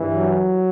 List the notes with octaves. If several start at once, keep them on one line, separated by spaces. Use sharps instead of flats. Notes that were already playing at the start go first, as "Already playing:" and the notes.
Already playing: G2 E3
F#3